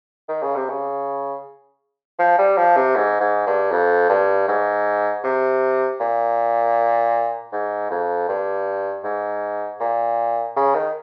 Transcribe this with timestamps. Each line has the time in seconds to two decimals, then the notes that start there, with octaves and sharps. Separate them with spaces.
0.29 D#3
0.42 C#3
0.56 C3
0.69 C#3
2.19 F3
2.38 G3
2.57 F3
2.76 C3
2.96 G#2
3.20 G#2
3.46 G2
3.71 F2
4.09 G2
4.48 G#2
5.24 C3
6.00 A#2
7.52 G#2
7.90 F2
8.28 G2
9.04 G#2
9.80 A#2
10.56 C#3
10.75 D#3